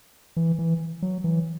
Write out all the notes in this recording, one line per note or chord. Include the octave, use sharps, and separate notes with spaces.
E3
E3
F#3
E3